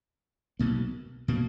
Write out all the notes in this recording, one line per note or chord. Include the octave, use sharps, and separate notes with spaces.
B1 B2 A#3
B2 A#3